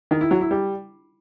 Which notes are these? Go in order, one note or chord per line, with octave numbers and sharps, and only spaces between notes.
D#3
E4
F#3
E4
G3